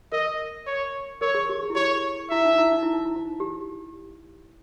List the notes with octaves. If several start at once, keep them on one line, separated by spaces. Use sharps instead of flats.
A#4 D#5
C#5
A#4 C#5
G#4
G4
G#4
E4
G4 C#5
E4 E5
D#4
E4
D#4
E4
D#4
E4
D#4
G4